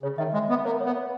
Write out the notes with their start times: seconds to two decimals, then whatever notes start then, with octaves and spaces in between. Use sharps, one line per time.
0.03 C#3 C#5
0.18 D#3 E5
0.34 G#3 E5
0.50 B3 E5
0.64 A#3 C#5
0.81 B3 C#5
0.96 C#5